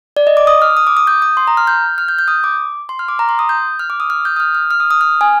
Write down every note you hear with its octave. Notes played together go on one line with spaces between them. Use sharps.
D5
D#5
D6
D#6
F6
D#6
D6
D#6
G6
D#6
C6
A#5
F6
G6
F6
G6
G6
D#6
D6
C6
F6
D6
A#5
C6
D#6
G6
F6
D6
D#6
F6
G6
D#6
F6
F6
F6
D#6
D#6
F6
G#5